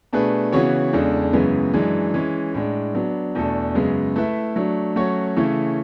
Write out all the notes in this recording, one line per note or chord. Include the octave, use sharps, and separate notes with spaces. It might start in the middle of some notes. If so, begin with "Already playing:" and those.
B2 A3 D4 G#4 B4
C#3 E3 B3 F#4 C#5
E2 C#3 G#3 D4 A4
F#2 C#3 E3 G#3 B3
F#2 E3 G#3 D4
E3 G#3 C#4
A2 G#3 D4
F#3 B3 D4
E2 B2 A3 D4 A4
F#2 C#3 G#3 B3
A3 E4 B4 E5
F#3 A3 D4
F#3 A3 C#4 F#4 C#5
C#3 E3 A3 C#4 E4